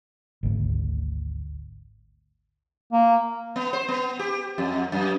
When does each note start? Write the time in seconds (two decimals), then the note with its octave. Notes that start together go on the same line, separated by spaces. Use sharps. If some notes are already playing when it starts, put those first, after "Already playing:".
0.43 G#1 D2
2.93 A#3
3.56 B3
3.73 C5
3.88 B3
4.19 G4
4.58 F2
4.92 F#2